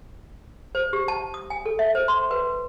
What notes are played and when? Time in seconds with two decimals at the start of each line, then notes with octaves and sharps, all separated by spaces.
0.75 C5
0.93 G4
1.08 A5
1.34 D#6
1.50 G#5
1.66 A4
1.79 E5
1.95 C5
2.08 C6
2.31 B4